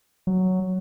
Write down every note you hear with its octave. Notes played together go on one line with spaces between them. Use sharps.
F#3